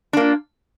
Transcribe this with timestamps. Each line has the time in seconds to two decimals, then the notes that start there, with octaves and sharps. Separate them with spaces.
0.13 D4
0.17 A#3
0.20 F4